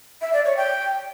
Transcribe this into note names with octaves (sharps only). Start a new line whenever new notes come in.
E5
D5
C#5
G5